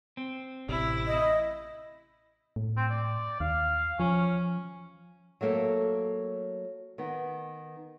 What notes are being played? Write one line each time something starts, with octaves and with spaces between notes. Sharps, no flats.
C4
A1 C3 E4
D#5
A2
C4
D5
D#2 F5
F3 C#4
F#3 A3 A#3 A4
D#3 B3